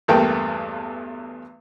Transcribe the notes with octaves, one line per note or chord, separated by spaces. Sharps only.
B1 E2 G2 A3 A#3 G5